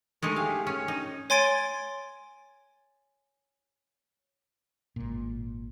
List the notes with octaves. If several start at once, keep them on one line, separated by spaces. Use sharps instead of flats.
G#3 A3 D#4 C#6
G4 G#4 F5
C#4 C#5
D#4
C#5 G#5 C6 G#6 A6 D7
G#1 A#2